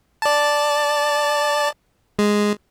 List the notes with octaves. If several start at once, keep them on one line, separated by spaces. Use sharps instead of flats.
D5 A5
G#3